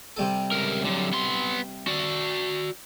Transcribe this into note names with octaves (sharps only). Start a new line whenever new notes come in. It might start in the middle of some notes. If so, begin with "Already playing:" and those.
C3 G3 A4
C#2 A#4
D3 F#3
B3 C6
F#4 D5